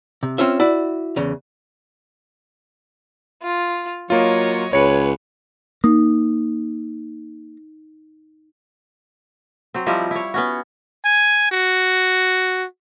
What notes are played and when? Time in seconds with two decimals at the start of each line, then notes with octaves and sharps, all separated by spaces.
0.23 C3
0.38 C4 C#4 F4 C5 E5
0.60 E4 F#4 D5
1.16 E2 C#3
3.42 F4
4.10 F#3 A#3 F4 C#5 D#5
4.73 C#2 B4 C#5 C#7
5.84 A#3 D#4
9.74 F#3 C4
9.87 F3 G3 D#4 E4
10.11 E4 C#5
10.34 B3 C#4 F#4
11.05 G#5
11.52 F#4